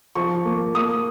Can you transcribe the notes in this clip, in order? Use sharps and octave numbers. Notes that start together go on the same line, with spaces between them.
F3 C#6
A#3
A#3 D#6